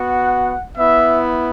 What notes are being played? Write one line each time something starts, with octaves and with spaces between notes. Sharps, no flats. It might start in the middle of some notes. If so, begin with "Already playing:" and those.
Already playing: B3 F#4 F#5
B3 E4 E5